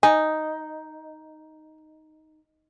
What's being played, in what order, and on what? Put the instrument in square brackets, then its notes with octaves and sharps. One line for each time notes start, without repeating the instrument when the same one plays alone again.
[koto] D#4 [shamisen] G#5